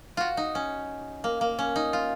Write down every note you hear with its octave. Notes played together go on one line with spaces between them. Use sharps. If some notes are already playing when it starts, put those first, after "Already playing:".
F4 F#4
D#4
C#4
A#3
A#3
C#4
D#4
F4